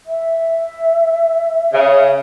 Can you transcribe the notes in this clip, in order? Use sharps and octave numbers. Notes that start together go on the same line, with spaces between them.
E5
C#3